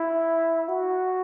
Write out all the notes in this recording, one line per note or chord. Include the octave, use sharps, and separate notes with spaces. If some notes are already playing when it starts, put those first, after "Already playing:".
Already playing: E4
F#4